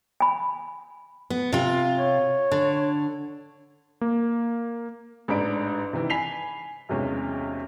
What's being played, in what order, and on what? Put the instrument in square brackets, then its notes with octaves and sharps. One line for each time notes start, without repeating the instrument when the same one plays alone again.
[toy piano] G#5 B5
[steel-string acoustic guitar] B3
C3 F4
[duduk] C#5
[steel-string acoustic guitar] D3
[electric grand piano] A#3
[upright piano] A1 G#2 D4 B5 D7
C3 D#3 E3
G#5 B5 B6 C7 F7 G7
B1 E2 C3 G#3 C#4